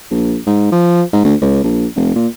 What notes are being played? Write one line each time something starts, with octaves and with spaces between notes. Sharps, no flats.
A#1
G#2
F3
G#2
D2
C#2
A#1
F1
A#2